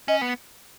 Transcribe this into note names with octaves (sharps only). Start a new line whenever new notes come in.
C#4 D#5
B3